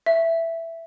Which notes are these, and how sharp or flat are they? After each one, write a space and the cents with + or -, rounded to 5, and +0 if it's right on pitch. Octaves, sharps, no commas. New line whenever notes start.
E5 +10